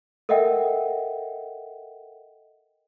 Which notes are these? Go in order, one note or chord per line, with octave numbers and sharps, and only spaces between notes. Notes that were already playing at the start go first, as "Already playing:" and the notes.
A4 A#4 D#5 E5 F#5 G5